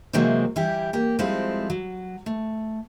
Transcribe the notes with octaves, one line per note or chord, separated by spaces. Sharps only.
C3 E3 F#3 G#3 A#3 C4
E3 G3 E4 G4
A#3 G4
F3 G3 G#3 C4 E4 A4
F#3
A3